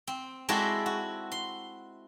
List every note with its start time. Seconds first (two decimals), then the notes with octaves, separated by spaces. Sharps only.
0.07 C4
0.49 G#3 C4 E4 F#4 A4 D5
0.86 F#4
1.32 C6